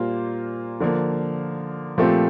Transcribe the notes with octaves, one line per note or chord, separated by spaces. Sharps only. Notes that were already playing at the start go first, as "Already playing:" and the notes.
Already playing: A#2 G3 A#3 F4 C5
D3 F3 A#3
A#2 F3 A3 C4 G4